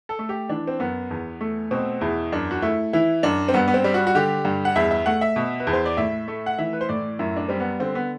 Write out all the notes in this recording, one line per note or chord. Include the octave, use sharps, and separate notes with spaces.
A4
A3
G4
E3 D4
C4
F#2 B3
E2
A3
B2 C4
E2 E4
F#2 D4
F#4
A3 E4
E3 E4
F#2 D4
C4
G2 B3
B3
C4
G3
F#4
F#4
D3 G4
G2
F#5
E2 E5
E5
A3 F#5
E5
B2
B4
E2
C5
D5
A2 E5
A3
F#5
E3 E5
B4
C5
A2 D5
F#2 E4
D4
G3 C4
B3
D3 C4
B3